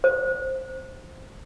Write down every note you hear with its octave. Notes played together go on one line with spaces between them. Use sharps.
C5